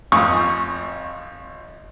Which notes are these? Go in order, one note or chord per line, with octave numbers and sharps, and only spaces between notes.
G#1 F2 C#6 D#6